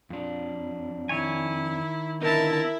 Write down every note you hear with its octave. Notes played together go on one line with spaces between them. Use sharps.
F2 D4
D#3 E4 C#5 G#5
D3 B3 D#4 E4 A#4 E5 A5